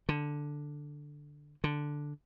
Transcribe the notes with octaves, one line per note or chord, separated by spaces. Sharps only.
D3
D3